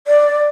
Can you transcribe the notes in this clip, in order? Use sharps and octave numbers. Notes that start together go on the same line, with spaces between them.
D5